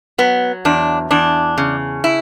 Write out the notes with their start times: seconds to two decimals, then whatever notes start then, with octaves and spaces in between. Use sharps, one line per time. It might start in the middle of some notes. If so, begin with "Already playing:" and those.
0.18 F#3 B3
0.65 E2 D4
1.11 E2 D4
1.58 C#3
2.04 E4